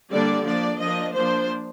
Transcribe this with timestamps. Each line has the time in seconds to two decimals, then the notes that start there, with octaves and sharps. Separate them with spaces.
0.11 D3 G3 A#3 D4 D5
0.45 F3 A#3 D4 D5
0.80 F3 A#3 D4 D#5
1.14 F3 A#3 D4 C5